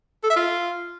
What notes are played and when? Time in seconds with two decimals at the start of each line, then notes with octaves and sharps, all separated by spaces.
0.24 A4
0.30 E5
0.36 F4